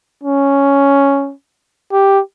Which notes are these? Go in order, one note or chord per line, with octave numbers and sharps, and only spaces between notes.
C#4
G4